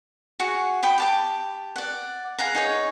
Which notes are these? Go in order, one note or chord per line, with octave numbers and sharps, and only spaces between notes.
F#4 G#4 F#5
G5 B5 D#6
G4 A5 D6
D5 F#5
G#4 F5 F#5 A#5
D#4 G#4 C#5